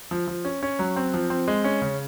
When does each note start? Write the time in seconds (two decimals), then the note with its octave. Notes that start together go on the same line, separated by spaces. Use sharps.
0.11 F3
0.27 F3
0.45 C#4
0.63 C#4
0.79 F#3
0.96 C4
1.14 F3
1.30 C4
1.48 G#3
1.64 C#4
1.82 C#3